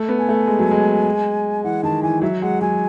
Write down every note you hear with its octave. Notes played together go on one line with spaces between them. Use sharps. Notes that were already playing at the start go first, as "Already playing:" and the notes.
Already playing: A3
B3
G#5
A3
G#3
F#3
G#3
E3 F#5
D#3 A5
E3 G#5
F#3 E5
G#3 F#5
F#3 G#5